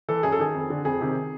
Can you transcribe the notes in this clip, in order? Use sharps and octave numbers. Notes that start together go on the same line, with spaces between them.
E3 A4
F#2 G#4
A4
D#3 G#4
F2
D3
F2 G#4
C3 D#3